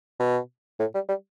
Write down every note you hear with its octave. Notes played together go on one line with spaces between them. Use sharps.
B2
A2
G3
G3